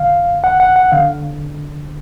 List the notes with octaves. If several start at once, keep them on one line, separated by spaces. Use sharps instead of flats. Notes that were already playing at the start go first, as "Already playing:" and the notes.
Already playing: F2 D3 F5
F#5
F#5
F#5
D3 F5